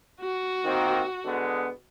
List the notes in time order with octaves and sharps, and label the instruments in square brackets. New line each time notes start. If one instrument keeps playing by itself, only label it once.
[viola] F#4
[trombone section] D#3 A#3 C4
D3 G#3 B3